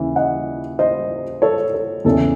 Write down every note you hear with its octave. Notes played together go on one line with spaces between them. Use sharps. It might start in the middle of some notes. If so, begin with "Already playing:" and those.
Already playing: D#2 C#3 E3
D#5 F#5
C5 D#5
A4 C#5
A4
E2 C#3 E3 A4